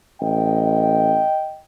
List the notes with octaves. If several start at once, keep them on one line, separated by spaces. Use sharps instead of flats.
A1 D#5 G5